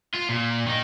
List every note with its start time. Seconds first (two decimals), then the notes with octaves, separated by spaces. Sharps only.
0.14 F4
0.29 A#2
0.66 D#3 D#4